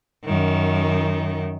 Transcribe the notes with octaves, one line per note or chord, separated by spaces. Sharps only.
F#2 D#3